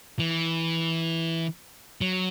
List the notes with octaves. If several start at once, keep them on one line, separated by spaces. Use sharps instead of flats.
E3
F#3